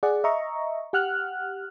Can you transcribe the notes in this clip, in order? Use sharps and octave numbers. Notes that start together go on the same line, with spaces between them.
G#4 D5 F#5
D#5 E5 A#5 C#6
G4 F#5 F6 F#6